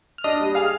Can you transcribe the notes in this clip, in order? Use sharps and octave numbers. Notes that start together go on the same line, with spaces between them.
F6
D4 D#5 D#6
G3
G#4 F5 F6